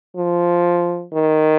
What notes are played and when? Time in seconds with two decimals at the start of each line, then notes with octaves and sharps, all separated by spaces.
0.16 F3
1.13 D#3